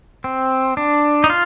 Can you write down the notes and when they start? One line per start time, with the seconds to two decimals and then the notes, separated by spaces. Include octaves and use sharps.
0.24 C4
0.77 D4
1.24 D#4
1.30 F4